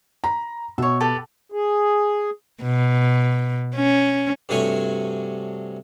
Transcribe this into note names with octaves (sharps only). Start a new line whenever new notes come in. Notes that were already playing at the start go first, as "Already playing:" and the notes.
A#5 B5
B2 C#5 E5
G4 A4 B4
G#4
B2
C#4
G2 C3 A3 F#4 C#5 G#5